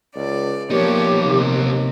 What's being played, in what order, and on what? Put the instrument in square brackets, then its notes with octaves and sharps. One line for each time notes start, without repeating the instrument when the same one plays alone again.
[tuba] C#2 [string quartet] D5
[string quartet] F3 C#5 [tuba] A#3 [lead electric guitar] B3 D#4 [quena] G4
[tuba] D#2 [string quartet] C3